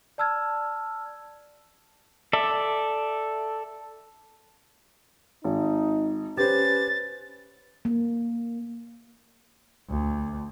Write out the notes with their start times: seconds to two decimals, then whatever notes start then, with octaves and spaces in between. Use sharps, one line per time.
0.18 D5 A5 E6 F6 G#6
2.33 A4 D5 E5
5.44 G#1 D#4
6.37 C#4 G4 B4 C5 A6
7.85 A#3
9.90 D2